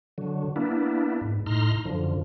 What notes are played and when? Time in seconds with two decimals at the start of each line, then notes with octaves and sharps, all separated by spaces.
0.18 D3 F#3
0.56 A#3 B3 D4 E4
1.21 G#2
1.46 A2 D#4 A#5 C6 F6
1.85 F#2 D3 F3